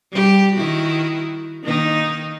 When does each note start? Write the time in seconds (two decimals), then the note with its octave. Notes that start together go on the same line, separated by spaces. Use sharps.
0.12 G3 G4
0.55 D#3 E4 F#4
1.63 D#3 A#3 D#4